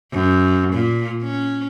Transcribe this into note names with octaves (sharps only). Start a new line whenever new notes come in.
F#2
A#2
C#4